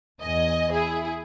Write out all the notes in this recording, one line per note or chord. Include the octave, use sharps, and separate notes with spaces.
E2 D#5 G#5
E4 G#4